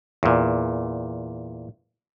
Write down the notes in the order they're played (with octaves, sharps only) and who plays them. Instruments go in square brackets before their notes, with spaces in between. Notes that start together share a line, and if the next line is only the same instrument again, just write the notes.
[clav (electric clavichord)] E2 A#2